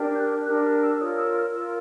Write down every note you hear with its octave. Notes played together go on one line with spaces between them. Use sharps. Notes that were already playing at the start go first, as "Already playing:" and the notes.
Already playing: D4 G4 A#4
G6
F#6
D4 G4 A#4 F#6
F6
E6
F4 A#4 C#5 D#6
E6
F6
F4 A#4 C#5 E6